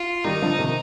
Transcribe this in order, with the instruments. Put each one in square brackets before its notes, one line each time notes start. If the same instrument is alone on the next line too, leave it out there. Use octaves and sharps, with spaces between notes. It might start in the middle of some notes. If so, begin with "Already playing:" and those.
Already playing: [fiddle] F4
[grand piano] D#3 G3 [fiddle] D#4
[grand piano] D3 F3
C3 D#3